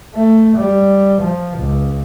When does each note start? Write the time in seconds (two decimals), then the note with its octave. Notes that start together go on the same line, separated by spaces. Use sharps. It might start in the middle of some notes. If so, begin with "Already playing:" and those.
0.14 A3
0.57 G3
1.21 F3
1.58 C#2